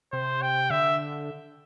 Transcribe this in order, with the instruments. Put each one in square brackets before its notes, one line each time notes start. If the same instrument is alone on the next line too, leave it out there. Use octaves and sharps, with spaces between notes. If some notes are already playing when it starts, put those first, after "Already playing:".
[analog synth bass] C3 [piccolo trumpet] C5
[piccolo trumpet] G5
[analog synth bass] D3 [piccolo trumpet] E5